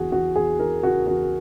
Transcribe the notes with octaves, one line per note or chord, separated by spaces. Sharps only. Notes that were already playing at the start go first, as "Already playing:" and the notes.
Already playing: E2 C#3 E3 F#4 G#4
E3 F#4
E2 G#4
E3 A#4
C#3 F#4
E2 F#4